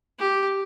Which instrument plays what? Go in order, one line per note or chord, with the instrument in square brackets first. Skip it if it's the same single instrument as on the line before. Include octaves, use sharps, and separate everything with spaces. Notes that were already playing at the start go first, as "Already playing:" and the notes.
[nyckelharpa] G4